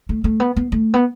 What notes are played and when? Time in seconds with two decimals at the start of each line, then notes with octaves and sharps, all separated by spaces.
0.09 A3
0.24 A3
0.40 B3
0.56 B3
0.72 A3
0.94 B3